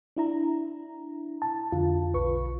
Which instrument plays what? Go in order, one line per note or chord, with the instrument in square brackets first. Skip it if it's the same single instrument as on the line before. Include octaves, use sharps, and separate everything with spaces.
[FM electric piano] D4 E4 A#5
[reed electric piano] A5
[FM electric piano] F2 D3 [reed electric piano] F4
[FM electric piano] B1 B4 C#6